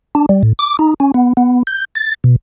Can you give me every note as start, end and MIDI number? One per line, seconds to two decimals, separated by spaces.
0.15 0.26 62
0.29 0.43 55
0.43 0.53 45
0.59 0.77 86
0.79 0.94 63
1.00 1.12 61
1.14 1.33 59
1.37 1.63 59
1.67 1.85 91
1.95 2.14 93
2.24 2.36 47